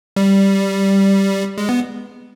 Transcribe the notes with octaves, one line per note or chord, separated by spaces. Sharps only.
G3
G#3
B3